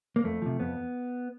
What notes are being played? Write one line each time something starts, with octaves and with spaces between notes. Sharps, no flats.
A#3
F2 A3
C3 F3
F2 B3